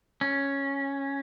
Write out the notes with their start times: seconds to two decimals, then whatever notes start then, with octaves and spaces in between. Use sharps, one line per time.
0.21 C#4